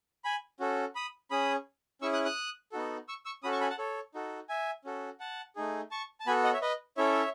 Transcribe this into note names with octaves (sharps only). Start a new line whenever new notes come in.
G#5 B5
C#4 F#4 A4
B5 D#6
C#4 G#4 B5 D#6
C#4 E4 G#4 C#6 E6
D#6 F#6
D#6 F#6
B3 D#4 F#4 A4
C#6 E6
C#6 E6
C#4 F#4 A4 B5 D#6
A5 C#6
G#5 B5
F#5 A5
A4 C#5
D#4 F#4 A4
E5 G#5
C#4 F#4 A4
F#5 A5
A3 D#4 G#4
A5 C#6
A5
B3 F#4 A4 G#5 B5
D#5 F#5
C#5 E5
B4 D#5
C#4 E4 A4 C#5 E5